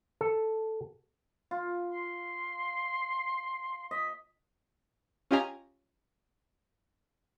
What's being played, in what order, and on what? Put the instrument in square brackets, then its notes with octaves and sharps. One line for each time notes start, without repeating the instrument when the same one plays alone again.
[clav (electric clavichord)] A4
[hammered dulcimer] F4
[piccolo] C6
[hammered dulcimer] D#5 [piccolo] B6
[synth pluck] C#4 F4 G4 D#5 G#5 A#5